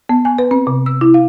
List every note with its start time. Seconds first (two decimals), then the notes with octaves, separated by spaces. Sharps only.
0.09 B3
0.25 G#5
0.38 B4
0.51 C4
0.67 C3
0.86 E6
1.01 E4
1.14 F5